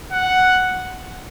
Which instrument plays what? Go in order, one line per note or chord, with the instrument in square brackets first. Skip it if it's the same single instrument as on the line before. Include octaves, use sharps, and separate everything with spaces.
[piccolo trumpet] F#5